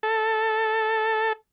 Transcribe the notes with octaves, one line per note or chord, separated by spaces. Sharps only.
A4